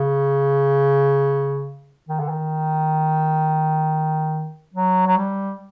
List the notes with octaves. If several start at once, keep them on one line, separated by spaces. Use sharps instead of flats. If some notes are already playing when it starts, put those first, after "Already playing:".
Already playing: C#3
D#3
D3
D#3
F#3
F#3
G3